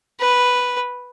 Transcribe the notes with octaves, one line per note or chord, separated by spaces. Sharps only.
B4